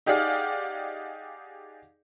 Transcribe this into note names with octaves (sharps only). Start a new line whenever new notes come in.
D#4 G4 G#4 D5 F5 F#5